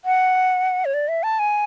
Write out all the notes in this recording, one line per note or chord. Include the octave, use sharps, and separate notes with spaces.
F#5
C#5
D5
E5
A5
G#5